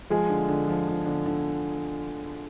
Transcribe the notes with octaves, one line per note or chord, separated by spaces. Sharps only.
F3 G#3 G#4
D3
D3
F3
F3
D3
D3